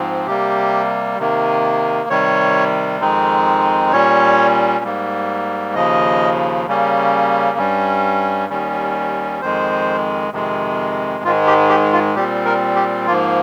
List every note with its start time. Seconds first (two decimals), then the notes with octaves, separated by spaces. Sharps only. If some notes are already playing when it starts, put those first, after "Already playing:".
Already playing: G#2 F3 C4
0.27 C3 G3 A#3 G4
1.19 C3 D#3 A#3
2.09 C3 D#3 G3 C#5
3.01 F2 D#3 G#3 C4 D#4
3.92 A#2 G3 C#4 C#5
4.84 G#2 G3 A#3
5.75 D#2 C#3 F3 D#5
6.67 C#3 G3 A#3 C#4
7.58 G2 G3 C#4
8.50 D#2 D#3 G3 C#4
9.42 F2 D#3 G#3 C5
10.32 F2 C3 D#3 G#3
11.24 G#2 D#3 G#3 F4
11.47 G4
11.69 G4
11.93 F4
12.15 A#2 G3 C4 G4
12.45 A#4
12.76 G4
13.06 G#2 F3 A#3 F4